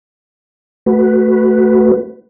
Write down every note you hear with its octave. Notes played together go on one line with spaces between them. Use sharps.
A3 F#4 B4